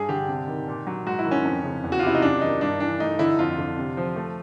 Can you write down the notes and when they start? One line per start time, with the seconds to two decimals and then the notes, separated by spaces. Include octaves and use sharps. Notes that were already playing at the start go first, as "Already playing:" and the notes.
Already playing: G2 G#4
0.09 D3 G4
0.28 C3
0.48 D#3
0.68 A#2
0.87 F#3
1.06 G#2 F#4
1.19 E4
1.25 D#3
1.31 C#4
1.45 F2
1.64 C#3
1.84 E2
1.92 F#4
1.99 F4
2.03 C3 E4
2.14 D#4
2.22 F#2 D4
2.41 D#3 D#4
2.61 G2 D4
2.80 E3 D4
3.00 A3 D#4
3.19 D3 E4
3.39 F2 F4
3.58 D3
3.78 C3
3.97 F3
4.16 A3